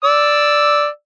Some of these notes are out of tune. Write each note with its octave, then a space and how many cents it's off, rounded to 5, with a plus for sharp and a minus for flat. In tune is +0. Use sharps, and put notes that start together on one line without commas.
D5 +0 E6 +5